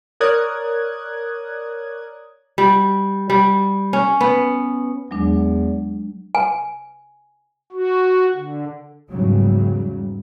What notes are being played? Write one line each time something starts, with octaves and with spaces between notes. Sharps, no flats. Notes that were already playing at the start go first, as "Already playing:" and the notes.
A#4 C#5 D5 D#6 F#6 G#6
G3
G3
C#4
B3
E2 F#3 G#3 D4
G#5
F#4
D3
E2 G#2 C#3 F#3 G3